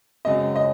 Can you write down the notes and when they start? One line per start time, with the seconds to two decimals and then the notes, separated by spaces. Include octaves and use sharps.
0.25 F#2 C#3 G#3 C4 D#5
0.56 D#5